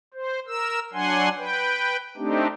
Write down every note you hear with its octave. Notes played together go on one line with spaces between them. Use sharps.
C5
A#4 E6
F#3 D4 F#5 G#5 C6
B4 G5
A3 C4 D4 D#4 G4